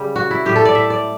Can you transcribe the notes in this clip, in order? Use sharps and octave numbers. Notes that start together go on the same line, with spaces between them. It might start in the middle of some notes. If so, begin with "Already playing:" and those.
Already playing: C#3 G3
F#4
E4
A2 G3 G4
A4
D5
E5
D5